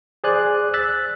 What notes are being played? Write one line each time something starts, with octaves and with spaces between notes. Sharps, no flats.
G#4 C5 D5 G#5 F#6
E6 F#6 A6 B6